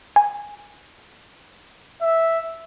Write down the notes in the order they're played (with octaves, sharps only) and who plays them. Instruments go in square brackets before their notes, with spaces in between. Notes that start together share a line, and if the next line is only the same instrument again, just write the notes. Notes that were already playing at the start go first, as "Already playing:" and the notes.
[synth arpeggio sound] G#5
[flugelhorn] E5